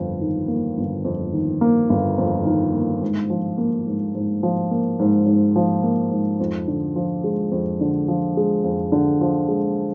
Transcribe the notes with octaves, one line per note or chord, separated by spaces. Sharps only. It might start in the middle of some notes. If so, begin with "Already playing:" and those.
Already playing: G1 F2
D#3
A#3
G1
F2
D#3
A#3
G1
F2
D#3
A#3
G#2
F3
A#3
G#2
G#2
F3
A#3
G#2
G#2
F3
A#3
G#2
F2
D3
F3
G#3
F2
D3
F3
G#3
F2
D3
F3
G#3